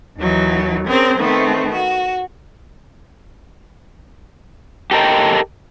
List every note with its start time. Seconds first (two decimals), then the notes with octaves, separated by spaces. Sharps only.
0.17 D#2 E3 F#3 D#4
0.87 C4 C#4 G#4 A#4 C5
1.18 D#3 A3 B3 C4
1.72 F#4
4.91 G4 A4 A#4 D#5 G5